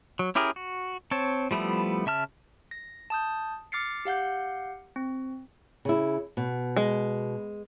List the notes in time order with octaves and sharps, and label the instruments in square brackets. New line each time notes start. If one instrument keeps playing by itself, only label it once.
[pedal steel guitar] F#3
C#4 E4 G4 G#4 A#4
F#4
C4 C#5 A5
F3 G3 A3 B3 E4
C#3 E5 A5 F6
[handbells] A#6
A5 D#6 G6
D6 F6 A6 C7 C#7
G4 F5 F#5 G6
C4
[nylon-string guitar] C#3 E4
B2
[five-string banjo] G#3